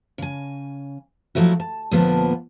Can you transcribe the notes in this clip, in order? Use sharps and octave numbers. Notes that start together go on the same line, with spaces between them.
C#3 G#5
F3 F#3 A3 E4 F#4
A5
D2 A#2 F3 A#3 B3 A5